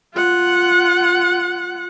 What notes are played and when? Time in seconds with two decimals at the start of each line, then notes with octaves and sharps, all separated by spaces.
0.14 F4 F#5